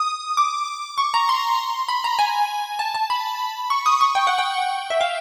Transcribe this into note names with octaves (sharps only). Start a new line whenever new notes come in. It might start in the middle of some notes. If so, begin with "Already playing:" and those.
Already playing: D#6
D6
C#6
A#5
C6
B5
A#5
G#5
A5
A5
B5
C#6
D#6
C#6
G5
F#5
G5
E5
F5